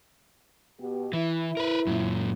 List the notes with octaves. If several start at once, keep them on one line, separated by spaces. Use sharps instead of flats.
B2 G4
E3 E4
A#4 B4
F#2 A#2